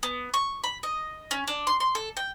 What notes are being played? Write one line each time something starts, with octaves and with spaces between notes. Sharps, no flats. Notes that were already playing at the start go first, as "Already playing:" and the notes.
B3
C#6
B5
D#5
C#4
D4
C6
C6
A4
G5